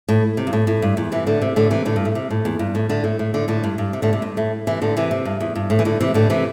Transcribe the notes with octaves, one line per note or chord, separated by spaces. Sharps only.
A2
C3
G2
A2
A2
G2
E2
C3 E3
A2 D3
C3
A2 D3
C3 E3
A2 D3
G2
A2
C3
A2
E2
G2
A2
A2 D3
A2
A2
A2 D3
A2 D3
G2
G2
C3
A2 D3
C3
G2
A2
C3 E3
A2 D3
C3 E3
C3
G2
E2
G2
A2
E3
A2 D3
C3 E3
A2 D3
C3 E3